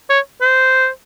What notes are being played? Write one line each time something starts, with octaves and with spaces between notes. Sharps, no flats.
C#5
C5